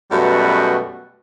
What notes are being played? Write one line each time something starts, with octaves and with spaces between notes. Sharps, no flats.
F#2 B2 G3 A3 F#4 B4